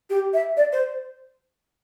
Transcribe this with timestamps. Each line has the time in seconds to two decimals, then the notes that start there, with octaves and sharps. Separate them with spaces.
0.10 G4
0.34 E5
0.57 D5
0.73 C5